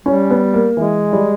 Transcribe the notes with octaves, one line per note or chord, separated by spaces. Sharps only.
G3 C#4
B3
A#3
E3 G#3
G3